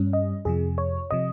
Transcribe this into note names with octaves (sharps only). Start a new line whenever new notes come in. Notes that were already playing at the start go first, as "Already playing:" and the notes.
Already playing: G2 G3 C#4
D#5
F2 C3 F3 G#4
C#5
C3 F3 D#5